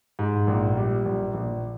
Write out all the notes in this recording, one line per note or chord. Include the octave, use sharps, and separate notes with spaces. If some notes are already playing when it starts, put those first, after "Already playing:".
G#2
A#1
G3
A#1
A#1